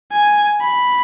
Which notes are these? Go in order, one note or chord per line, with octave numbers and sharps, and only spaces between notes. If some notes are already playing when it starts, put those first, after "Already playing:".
G#5
B5